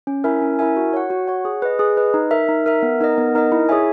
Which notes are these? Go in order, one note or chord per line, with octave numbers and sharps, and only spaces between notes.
C#4
E4 A#4 E5 G#5
C#4
E4 A#4 E5 G#5
F#4
C#5 F#5
F#4
C#5 F#5
G#4
B4 D#5
G#4
B4 D#5
D#4
A#4 E5
D#4
A#4 E5
B3
D#4 A#4 D#5
B3
D#4 A#4 D#5
E4
G#4 C#5 E5 G#5